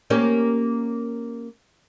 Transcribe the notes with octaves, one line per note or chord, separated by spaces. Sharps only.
A#3 C#4 G4